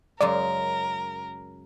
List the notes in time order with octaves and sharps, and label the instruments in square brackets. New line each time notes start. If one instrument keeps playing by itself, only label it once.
[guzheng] F#2 C#3 G#3 [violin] A#4 [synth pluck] D5